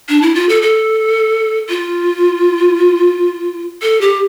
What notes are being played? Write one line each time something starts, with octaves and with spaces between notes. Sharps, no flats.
D4
E4
F4
A4
A4
F4
A4
G4